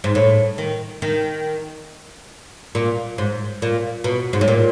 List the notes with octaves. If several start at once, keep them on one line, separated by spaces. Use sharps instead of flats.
G#2
A2
D#3
D#3
A#2
G#2
A#2
B2
G#2
A2
A#2